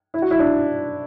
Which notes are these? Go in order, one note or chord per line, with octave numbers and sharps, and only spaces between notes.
E4
F#4
E4
D4